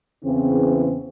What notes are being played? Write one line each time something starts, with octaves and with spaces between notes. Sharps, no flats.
E2 C#3 E3 C4